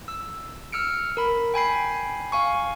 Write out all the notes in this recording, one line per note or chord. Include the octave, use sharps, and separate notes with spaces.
E6
E6 F6 C#7 D7
A#4 B5
G5 G#5 B5 C7
F5 G#5 C#6